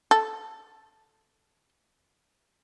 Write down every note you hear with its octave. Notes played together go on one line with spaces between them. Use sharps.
A4